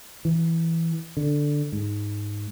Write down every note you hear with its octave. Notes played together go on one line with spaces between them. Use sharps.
E3
D3
G#2